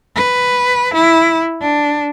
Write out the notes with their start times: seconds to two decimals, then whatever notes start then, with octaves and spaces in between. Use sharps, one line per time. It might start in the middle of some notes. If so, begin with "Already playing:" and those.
0.16 B4
0.95 E4
1.62 D4